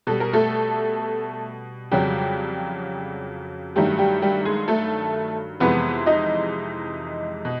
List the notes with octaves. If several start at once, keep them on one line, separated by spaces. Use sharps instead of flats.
B2 G3 A4
A#4
A3 A4
F2 C#3 F#3 G3 G4
G2 D#3 F#3 G3 A3 G4
G3 G4
G3 G4
G#3 G#4
A3 A4
F2 C3 E3 G#3 B3 B4
D#4 D#5
B2